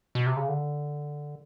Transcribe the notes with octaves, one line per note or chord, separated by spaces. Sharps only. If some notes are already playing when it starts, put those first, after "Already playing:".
B2
C3
C#3
D3